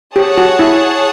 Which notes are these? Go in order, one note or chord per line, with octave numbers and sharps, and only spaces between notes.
G4 G#4 C#5 F#5 A5
F#4
E4